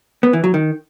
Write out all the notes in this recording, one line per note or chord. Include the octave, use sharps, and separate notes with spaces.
B3
E3
F#3
D#3